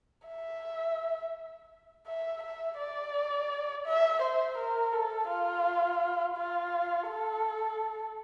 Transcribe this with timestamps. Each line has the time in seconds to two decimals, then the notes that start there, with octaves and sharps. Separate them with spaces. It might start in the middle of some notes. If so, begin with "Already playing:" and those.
0.28 E5
2.07 E5
2.43 E5
2.79 D5
3.86 E5
4.22 C5
4.57 A#4
4.93 A4
5.29 F4
6.37 F4
7.09 A4